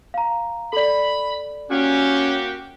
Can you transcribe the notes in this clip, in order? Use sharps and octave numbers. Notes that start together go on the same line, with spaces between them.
F5 A#5
A4 D5 B5
A#3 C#4 F#4 G4